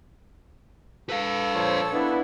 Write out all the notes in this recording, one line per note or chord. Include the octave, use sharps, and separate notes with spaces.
A4 B4 F5
A#2 F3 C5 C#5
B3 D4 E4